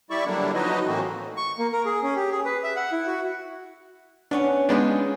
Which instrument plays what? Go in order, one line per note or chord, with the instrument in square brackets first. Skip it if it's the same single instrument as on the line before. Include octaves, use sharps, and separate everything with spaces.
[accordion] G3 E4 D5 E5 C#6
D3 F#3 G3 A#3 D4 E4
F3 F#3 D#4 F#4 B4 D#5
A2 E3 A3 A#3 C4 F#4
[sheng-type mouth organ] C#6
A#3
A#4
G#4
C#4
G4
G#4
B4
E5
F#5
E4
F#4
[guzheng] B3 C#4 F#5 [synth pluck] D4
[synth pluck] G#3 B3 D4 [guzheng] D#4 F4 G#4